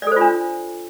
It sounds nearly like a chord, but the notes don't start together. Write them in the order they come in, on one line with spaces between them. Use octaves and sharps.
D5 A4 C5 F4 D4